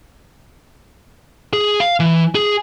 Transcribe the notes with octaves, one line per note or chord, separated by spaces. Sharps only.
G#4
F5
E3
G#4